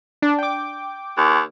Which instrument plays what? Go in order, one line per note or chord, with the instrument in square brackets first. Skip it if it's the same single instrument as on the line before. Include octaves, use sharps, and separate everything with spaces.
[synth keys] D4
G5 D6
[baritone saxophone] D#2